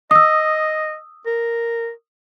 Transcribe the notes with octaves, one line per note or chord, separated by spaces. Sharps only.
D#5 D#6 E6
A#4